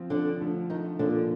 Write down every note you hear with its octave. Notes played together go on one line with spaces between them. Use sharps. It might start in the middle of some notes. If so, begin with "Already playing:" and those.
Already playing: F3 C4 F4
D3 D4
D3 F3 A3
D#3 D#4
A#2 D3 F3 A#3 D4 F4